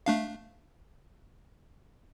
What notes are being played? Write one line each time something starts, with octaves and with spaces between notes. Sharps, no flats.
A3 D4 F5